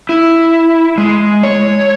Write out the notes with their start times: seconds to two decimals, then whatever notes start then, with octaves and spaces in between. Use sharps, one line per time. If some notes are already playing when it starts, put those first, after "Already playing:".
0.09 E4
0.98 G#3
1.43 C#5